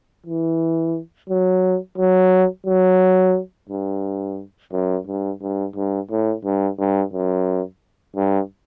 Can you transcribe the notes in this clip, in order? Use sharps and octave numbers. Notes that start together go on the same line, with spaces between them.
E3
F#3
F#3
F#3
G2
F#2
G2
G2
G2
A2
G2
G2
F#2
G2